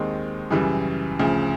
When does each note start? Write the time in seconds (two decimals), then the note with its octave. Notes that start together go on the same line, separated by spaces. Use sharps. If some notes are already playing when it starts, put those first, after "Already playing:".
Already playing: D#2 D#3 G#3 C4
0.51 F#2 C#3 E3 G3
1.19 D2 C#3 F3